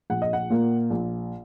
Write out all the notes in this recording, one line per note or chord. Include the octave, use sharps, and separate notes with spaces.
A#1 F#5
D#5
F#5
A#2 A#3
A#1